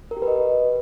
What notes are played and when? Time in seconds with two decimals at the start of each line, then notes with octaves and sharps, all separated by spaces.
0.11 A#4
0.17 G4
0.22 B4
0.28 D#5